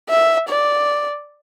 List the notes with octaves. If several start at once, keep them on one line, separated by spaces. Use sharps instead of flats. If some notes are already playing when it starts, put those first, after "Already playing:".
E5
D5